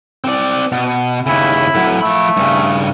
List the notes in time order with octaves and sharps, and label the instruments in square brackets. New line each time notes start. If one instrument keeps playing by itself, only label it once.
[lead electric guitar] C4 D5
B2
[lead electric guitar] D#2 C#3 [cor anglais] E4
[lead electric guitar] A2 F#3
[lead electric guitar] F3 B5 [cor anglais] A3
[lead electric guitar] G2 C#3